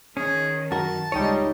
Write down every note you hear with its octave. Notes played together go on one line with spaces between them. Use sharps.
D#3 C#4 G#4
F#2 F#4 A#4 A5
C#2 G3 D#4 C#5 D#5 G5